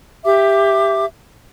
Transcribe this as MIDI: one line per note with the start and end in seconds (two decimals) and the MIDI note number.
0.24 1.05 67
0.24 1.05 76
0.24 1.05 86